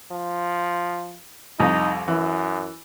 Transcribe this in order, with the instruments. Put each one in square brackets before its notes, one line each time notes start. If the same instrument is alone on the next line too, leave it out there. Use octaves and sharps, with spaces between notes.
[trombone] F3
[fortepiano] C2 F2 [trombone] D#4
[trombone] F#2 [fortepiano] E3